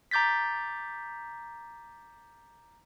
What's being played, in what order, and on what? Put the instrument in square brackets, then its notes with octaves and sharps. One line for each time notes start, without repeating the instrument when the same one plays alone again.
[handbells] A#5 D6 G6 A6 B6